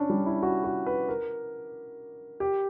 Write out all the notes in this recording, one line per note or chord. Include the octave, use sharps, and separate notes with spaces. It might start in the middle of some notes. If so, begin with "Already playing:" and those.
Already playing: C#4 D4
G3
E4
F#4
F#4
B4
A#4
G4